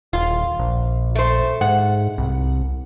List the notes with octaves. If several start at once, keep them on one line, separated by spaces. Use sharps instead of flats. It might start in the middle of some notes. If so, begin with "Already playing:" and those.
D#1 F4
A#1
A3 C5
G#2 F#5
C2